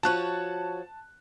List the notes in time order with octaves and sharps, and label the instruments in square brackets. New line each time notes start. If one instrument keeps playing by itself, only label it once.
[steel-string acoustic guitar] F3 F#4 C#5 [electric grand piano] A5 F#6